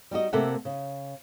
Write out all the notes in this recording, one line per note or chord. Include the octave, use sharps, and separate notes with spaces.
G3 D#4 F#4 D#5
C3 A3 A#3 A4 E5 F#5
C#3